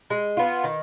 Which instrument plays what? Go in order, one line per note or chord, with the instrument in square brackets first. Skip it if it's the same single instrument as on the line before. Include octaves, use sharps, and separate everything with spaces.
[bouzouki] G#3
B3 F4
D#3